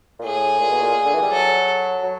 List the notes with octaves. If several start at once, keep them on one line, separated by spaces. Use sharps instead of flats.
A#2
A2 G#4
A#2
B2
A#2
D3
E3
G3
F#3 A4
F#3